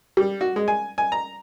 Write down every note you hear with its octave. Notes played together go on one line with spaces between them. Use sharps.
G3
F#4
G#3
G#5
G#5
A#5